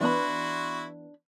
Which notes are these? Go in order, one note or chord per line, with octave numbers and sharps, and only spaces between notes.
E3 B3 D4 E4 F#4 B5 C6